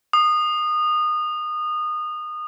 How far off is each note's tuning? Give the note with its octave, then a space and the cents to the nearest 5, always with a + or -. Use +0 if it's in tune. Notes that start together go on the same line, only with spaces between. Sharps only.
D#6 -25